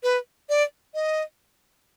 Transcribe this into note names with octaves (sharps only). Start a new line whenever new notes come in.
B4
D5
D#5